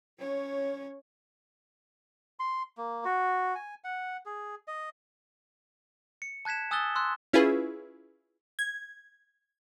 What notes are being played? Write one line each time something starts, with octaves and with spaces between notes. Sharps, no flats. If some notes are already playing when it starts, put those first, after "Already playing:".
C#4 C#5
C6
A#3
F#4
G#5
F#5
G#4
D#5
C#7
A5 F#6 G#6 B6 E7
G#5 D#6 E6 F#6 A6 G7
C6 E6 F#6
C#4 E4 F4 G#4 B4
G#6